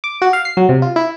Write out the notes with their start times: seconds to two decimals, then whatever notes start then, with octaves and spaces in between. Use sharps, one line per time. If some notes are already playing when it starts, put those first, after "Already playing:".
0.04 D6
0.22 F#4
0.33 F5
0.45 C7
0.57 F#3
0.69 C3
0.82 F4
0.96 E4